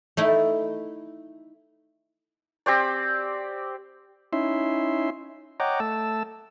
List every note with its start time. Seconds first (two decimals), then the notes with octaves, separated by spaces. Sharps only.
0.17 A3 D#4 E4
2.66 C4 G4 C5 D5
4.33 C#4 D#4 E4 E5 C6
5.60 C#5 D#5 F#5 G5 A#5 D6
5.80 A3 A5 E6